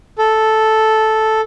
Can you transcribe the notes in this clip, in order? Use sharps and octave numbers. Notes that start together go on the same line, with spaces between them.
A4